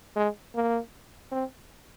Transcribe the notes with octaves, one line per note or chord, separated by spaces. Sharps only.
G#3
A#3
C4